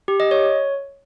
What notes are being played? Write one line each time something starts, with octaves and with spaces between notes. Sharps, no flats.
G4
D#5
C#5